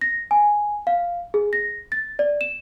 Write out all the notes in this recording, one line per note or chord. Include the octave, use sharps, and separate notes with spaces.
A#6
G#5
F5
G#4
A#6
A6
D5
E7